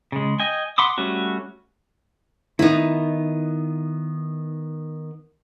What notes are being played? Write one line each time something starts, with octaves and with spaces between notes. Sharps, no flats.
C#3 G#3
D#5 G5 G#5
F#5 B5 C6 D6 D#6
G3 A3 C#4 F#4
D#3 B3 D#4 E4